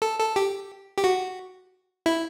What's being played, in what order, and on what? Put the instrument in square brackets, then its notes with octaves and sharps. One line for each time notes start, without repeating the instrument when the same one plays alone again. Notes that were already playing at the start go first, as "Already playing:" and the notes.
[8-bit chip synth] A4
A4
G4
G4
F#4
E4